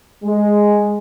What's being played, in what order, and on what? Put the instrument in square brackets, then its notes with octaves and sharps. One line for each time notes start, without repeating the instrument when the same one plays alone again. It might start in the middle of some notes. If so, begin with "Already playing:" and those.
[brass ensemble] G#3